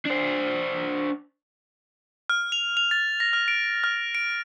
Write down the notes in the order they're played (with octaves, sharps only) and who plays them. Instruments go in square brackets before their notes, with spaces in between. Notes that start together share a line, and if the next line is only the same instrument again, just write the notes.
[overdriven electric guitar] D4 C5
[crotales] F6
F7
F7
A6
A#6
F6
D7
F6
D7